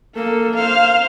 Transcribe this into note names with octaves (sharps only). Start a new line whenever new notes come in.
A#3 A4
C5 F5